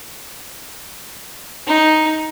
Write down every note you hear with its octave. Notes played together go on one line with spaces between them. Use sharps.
D#4